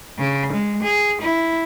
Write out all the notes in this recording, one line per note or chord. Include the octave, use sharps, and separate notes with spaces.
C#3
G#3
G#4
E4